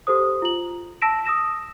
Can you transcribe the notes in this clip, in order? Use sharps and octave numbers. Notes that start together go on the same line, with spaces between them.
G4 A4 C5 D#6
F4 F#7
A5 E6 A#6 B6 D7 E7
D#6 E6 A#6 E7